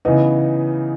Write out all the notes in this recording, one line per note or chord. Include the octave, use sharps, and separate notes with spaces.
C#3 E3 B3 D#4